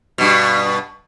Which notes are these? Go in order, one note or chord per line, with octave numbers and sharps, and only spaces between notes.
G2 B2